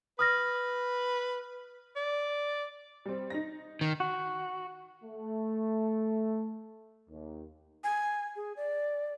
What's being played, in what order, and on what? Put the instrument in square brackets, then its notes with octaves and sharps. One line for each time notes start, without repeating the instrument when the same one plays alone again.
[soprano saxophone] B4 [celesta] D#6 F6 A#6
[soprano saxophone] D5
[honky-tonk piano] G3 C4
D#4 A#6
[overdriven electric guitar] D#3
[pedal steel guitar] F#4
[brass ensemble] A3
D#2
[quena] G#5
G#4
D5